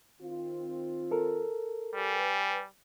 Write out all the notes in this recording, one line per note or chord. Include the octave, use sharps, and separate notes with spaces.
D#3 C4 F4
A4 A#4
G3 G4 B4 G#5